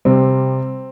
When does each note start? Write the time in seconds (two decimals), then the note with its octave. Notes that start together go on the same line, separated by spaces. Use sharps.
0.05 C3 G3 C4